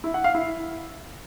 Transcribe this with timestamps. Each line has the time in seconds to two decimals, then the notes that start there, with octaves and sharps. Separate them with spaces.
0.04 E4
0.14 F#5
0.24 F5
0.35 E4